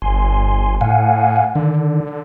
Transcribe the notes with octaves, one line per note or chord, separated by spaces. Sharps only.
G1 G#5 C6
A2 F5 F#5 G#5
D3 D#3